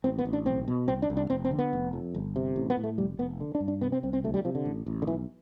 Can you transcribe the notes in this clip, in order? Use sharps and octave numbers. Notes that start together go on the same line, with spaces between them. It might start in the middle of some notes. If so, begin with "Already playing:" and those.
A1 C4
B3
A1
D4
B1 C4
B2
C2 C4
D4
C2
D4
F1 C4
C4
D3
B3
F1
F2
G1
C3
A1
B3
A2
A3
F1 G3
F1 B3
D3
D4
G2
D4
C3 B3
C4
C2 C4
C4
D2 A3
G3
C3 F3
D3
A1
A1
D3
B1 E3